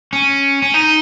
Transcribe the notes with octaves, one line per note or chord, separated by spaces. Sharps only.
C#4
C#4
D#4